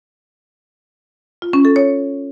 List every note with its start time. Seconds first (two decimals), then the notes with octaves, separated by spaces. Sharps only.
1.42 F4
1.53 C#4
1.65 A4
1.76 C#5